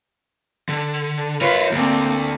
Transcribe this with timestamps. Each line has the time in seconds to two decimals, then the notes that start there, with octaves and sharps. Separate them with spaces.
0.69 D3
1.41 F4 A#4 B4 C#5
1.72 D2 A#3 C4